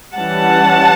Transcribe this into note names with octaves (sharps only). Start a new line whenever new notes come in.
E3 G3 C#4 F#5 A5